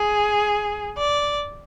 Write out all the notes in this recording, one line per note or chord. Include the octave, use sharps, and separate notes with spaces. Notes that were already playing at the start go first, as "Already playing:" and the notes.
Already playing: G#4
D5